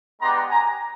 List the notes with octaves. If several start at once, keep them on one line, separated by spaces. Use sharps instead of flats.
G#3 B3 D4 G4 A#5 C6
G#5 A#5